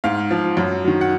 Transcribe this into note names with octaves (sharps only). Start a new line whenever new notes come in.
G#2 F5
F3
F#2
D#3 F#3
F#5